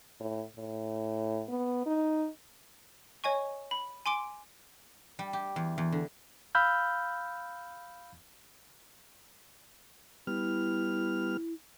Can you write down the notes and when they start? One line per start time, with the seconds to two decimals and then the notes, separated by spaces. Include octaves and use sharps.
0.20 A2
0.57 A2
1.49 B3
1.86 D#4
3.24 C#5 D#5 G#5 C#6
3.71 B5
4.06 G#5 C6 D6 D7
5.19 G3
5.33 G4
5.56 E2
5.78 E2
5.92 D3
6.55 F5 B5 E6 F6 G6
10.27 G3 B3 E4 F6